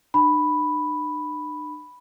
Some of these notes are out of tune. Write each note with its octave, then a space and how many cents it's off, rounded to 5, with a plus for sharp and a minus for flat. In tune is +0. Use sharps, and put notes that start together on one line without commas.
D4 +45 B5 +0